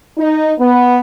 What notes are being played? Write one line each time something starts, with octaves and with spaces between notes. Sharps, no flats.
D#4
B3